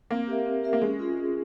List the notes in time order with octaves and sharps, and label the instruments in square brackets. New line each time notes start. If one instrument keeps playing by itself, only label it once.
[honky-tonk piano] A#3 [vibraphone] C4
[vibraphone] G4 A#4 E5
C4
G4 A#4 E5
[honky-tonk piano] A#3
[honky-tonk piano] G#3 [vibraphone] C#4
[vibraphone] F4 G#4
C#4